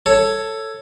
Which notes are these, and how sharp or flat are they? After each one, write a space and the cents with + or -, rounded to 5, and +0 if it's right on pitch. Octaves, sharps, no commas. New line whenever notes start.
A4 +10 C#5 +0